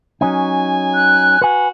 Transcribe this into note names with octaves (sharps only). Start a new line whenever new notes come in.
F#3 C#4 D#4 G#5
F#6
F#4 B4 G#5